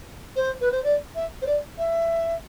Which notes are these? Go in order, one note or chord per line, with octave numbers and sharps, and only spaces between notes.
C5
B4
C5
D5
E5
C5
D5
E5